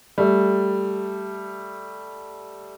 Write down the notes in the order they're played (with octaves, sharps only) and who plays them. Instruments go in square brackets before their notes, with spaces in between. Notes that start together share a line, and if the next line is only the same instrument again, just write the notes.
[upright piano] G3 A3